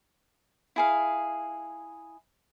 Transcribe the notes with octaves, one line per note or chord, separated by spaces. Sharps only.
E4 G#4 F5